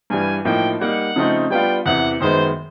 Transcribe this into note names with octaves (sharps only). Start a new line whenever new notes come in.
G2 E3 G3 G#5
A2 F3 A#3 D#4 G5
G3 A#3 D#4 F#5
C#3 F3 A3 C4 D#4
G3 B3 D4 F4 G5
E2 C3 E3 F#5
F#2 D#3 G#3 B3 C5